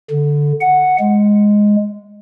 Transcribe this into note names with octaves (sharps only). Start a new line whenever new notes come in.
D3
F#5
G#3